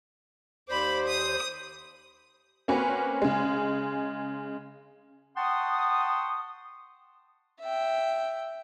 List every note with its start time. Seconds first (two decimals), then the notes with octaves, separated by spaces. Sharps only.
0.69 D#2 C5 D5 B5
1.08 D#6
2.68 A#3 C4 C#4 F#4 B4
3.22 C#3 G#3
5.37 F#5 G5 A5 C6 C#6 D#6
7.61 E5 G5